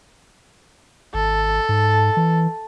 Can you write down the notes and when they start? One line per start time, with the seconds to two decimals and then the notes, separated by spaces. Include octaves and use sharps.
1.14 G#1 A4
1.69 G#2
2.17 E3